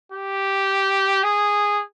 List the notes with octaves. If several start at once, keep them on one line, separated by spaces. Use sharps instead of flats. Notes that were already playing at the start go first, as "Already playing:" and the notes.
G4
G#4